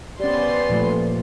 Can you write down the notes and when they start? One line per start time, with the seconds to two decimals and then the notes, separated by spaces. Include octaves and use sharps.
0.20 B3 C#4 G4 C5 D5 C6
0.69 A#2 F3 A3